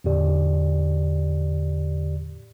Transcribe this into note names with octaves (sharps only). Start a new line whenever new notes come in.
E2 A2 D3 G4 D5